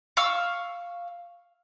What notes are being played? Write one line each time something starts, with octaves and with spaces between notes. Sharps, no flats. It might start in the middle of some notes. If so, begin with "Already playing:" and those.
F5 C#6 E6